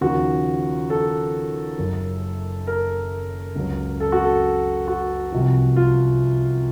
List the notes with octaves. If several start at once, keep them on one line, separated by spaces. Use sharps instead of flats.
D#2 C#3 F3 F#4
A4
F#1 F#2 C#3
A#4
C#2 C#3 F#3
A4
F#4
A4
F#4
C2 C3 F3
F4